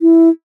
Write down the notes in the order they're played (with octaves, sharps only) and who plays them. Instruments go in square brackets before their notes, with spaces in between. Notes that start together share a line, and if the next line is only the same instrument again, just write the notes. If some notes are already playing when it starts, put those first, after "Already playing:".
[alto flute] E4